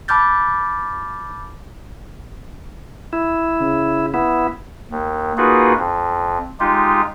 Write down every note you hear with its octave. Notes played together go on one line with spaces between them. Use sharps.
A5 B5 D6 F6 G6 A6
E4
C#3
B3 E4
D#2
A#3 D#4 F4 F#4 G#4 B4
F2
G#3 D#4 F4 G4